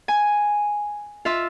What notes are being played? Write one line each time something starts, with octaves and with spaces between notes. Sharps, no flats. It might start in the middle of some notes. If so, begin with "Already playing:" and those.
G#5
F4 E5